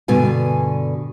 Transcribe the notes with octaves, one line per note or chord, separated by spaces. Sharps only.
G2 B2 D3 G#5